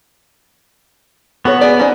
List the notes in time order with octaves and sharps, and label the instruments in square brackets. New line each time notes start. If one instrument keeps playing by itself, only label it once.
[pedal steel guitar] B3 [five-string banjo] F#4 A4 C#5
[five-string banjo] G#4 D5
C#4 D#4 C5